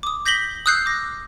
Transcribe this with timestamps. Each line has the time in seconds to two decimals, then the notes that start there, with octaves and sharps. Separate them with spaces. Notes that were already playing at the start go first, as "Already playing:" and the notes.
0.03 D6 D#6
0.26 G6 A#6 B6 F#7 G7
0.66 D#6 E6 F#6 G6 C7
0.86 D6 A#6